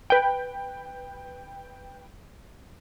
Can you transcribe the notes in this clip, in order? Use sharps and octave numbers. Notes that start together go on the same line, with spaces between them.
B4 G5